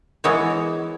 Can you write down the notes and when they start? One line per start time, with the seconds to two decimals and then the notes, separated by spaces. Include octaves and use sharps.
0.24 E3 G#3 B3 E4 C#5